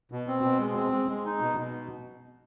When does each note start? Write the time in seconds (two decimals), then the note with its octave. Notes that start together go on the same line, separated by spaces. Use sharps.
0.12 B2
0.27 C4
0.44 B2
0.59 G#3
0.77 C4
0.92 G#3
1.09 G#3
1.25 D#4
1.41 B2
1.58 B2